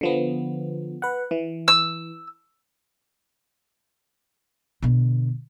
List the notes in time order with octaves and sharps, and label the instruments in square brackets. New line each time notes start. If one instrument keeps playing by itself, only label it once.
[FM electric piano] D3 F3 B3
B4 F#5
E3
[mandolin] E6
[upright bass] B2 D3